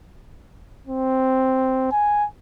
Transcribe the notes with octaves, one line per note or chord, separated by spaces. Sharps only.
C4
G#5